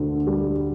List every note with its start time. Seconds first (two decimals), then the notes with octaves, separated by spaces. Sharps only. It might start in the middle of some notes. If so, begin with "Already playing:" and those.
Already playing: D2 D3
0.27 G3